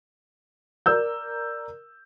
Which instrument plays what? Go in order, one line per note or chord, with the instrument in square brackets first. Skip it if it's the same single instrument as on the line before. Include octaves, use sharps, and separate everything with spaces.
[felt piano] A#4 D5 E6 G6